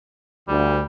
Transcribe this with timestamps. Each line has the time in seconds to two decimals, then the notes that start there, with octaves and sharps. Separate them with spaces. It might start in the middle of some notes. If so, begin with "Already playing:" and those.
0.48 D2 G3